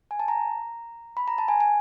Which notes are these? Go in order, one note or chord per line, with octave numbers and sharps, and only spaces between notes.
G#5
A5
A#5
B5
A#5
A5
G#5
G#5